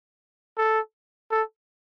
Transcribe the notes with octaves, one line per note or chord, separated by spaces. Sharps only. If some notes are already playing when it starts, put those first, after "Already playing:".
A4
A4